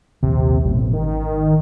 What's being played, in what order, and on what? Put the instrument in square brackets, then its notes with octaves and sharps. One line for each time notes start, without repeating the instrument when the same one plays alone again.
[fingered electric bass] A#1 D#2 [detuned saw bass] C3
[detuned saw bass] A1 [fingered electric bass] B2 F#3
[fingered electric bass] G#1 [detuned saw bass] D#3